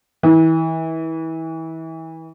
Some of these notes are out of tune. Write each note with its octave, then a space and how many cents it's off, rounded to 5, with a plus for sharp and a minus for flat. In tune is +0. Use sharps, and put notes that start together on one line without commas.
E3 -35